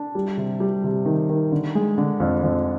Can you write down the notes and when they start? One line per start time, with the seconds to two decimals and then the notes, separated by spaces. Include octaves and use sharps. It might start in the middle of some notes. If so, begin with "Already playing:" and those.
Already playing: D4
0.15 G3
0.38 C3
0.60 G3
0.84 C3
1.06 D#3
1.29 D#3
1.52 D3
1.75 G#3
1.98 D3
2.20 F2
2.43 F2